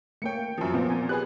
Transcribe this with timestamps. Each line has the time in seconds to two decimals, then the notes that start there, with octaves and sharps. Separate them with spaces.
0.22 A3 A#3 C#5 G5 C#7
0.58 F#2 F3
0.73 A#2 F3 B3 C4 F4
0.89 G#5
1.09 G4 G#4 B4 F#6